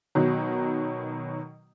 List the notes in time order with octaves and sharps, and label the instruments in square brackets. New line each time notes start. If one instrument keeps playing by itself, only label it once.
[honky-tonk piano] B2 D#3 F#3